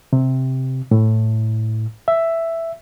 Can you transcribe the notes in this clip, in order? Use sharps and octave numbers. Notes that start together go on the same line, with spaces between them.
C3
A2
E5